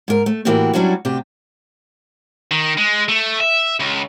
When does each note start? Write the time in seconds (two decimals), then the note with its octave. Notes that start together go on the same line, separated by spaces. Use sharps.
0.08 G#2 A#4
0.26 A3
0.45 A2 E3 A#3 E4 F#4 G4
0.73 F#3 G3 C#4 D4 E4 F#4
1.05 D2 C3 G4
2.51 D#3
2.77 G#3
3.08 A3
3.41 E5
3.80 C#2